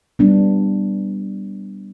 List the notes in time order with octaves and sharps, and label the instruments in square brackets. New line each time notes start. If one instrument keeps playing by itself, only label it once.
[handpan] G3 B3 D4